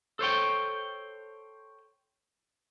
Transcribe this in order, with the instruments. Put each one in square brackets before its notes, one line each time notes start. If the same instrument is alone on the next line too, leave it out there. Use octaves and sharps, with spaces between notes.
[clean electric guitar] A4 C5 C#5 G5